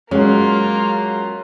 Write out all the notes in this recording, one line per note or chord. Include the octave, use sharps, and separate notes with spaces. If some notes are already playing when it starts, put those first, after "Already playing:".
F#3 G#3 A#3 C#4 F4